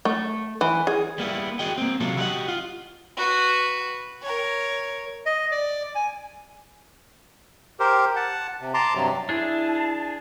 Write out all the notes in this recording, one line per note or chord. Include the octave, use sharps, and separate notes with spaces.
A3
E3
G#4
G3 A#3 B3 E4
F#4 G#4 D#5 G5
A#3 C4
C3 F#3 G#3 F4 A4
E4 F#4 G4 B4 D#5 F#5
F4
F#4 B4
A#4 C#5
D#5
D5
G#5
G4 A#4 C5
F#5 A5
C3
A5 A#5 C6 D6
G2 C3 F#3
D4 E4 G#4 A5